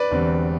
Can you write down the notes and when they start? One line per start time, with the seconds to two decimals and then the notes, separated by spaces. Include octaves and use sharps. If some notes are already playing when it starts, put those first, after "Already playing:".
Already playing: B4 D5
0.10 E1 E2 D3 G3 C4